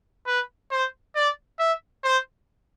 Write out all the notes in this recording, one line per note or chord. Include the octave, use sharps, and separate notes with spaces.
B4
C5
D5
E5
C5